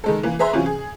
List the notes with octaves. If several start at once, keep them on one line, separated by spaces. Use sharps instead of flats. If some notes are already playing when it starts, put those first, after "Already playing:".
D#3 G#3 A4
E3 A#3
G#4 B4 E5 A#5 C6
C3 E3 F#3 C#4 F4
G#4